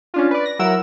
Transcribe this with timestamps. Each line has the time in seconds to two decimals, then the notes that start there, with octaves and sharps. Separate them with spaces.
0.14 C#4 D4 F4
0.31 B4 D5
0.45 A#6
0.59 F#3 E4 A#4 F#5 E6 E7